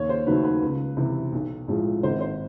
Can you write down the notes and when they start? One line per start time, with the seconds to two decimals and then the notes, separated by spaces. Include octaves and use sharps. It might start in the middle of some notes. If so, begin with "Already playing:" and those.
Already playing: D#2 C#5
0.09 C5
0.27 D#3 F#3 A3 B4
0.44 B4
0.62 C#2
0.97 C3 E3
1.32 B1
1.68 A2 F3 G#3
2.03 G#1 C5
2.21 C5